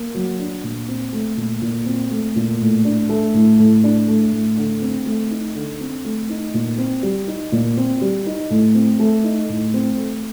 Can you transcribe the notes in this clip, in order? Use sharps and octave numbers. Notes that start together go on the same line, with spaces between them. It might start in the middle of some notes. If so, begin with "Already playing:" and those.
Already playing: A#3
F#3
D4
A#2
C4
A3
A#2
A#2
C4
A3
A#2
A2
D4
A3
A2
A2
D4
A3
A2
D3
C4
A3
D#4
D3
C4
A3
D#4
A#2
C4
G3
D#4
A#2
C4
G3
D#4
A2
C4
A3
D#4
A2
C4
A3